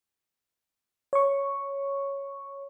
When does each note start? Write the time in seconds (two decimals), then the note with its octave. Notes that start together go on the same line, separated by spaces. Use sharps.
1.13 C#5 C#6